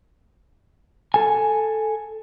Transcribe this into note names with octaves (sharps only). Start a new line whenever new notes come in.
A4 G#5